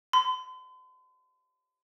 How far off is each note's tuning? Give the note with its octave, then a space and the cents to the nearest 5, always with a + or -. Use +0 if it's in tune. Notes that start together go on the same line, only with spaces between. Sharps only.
C6 -45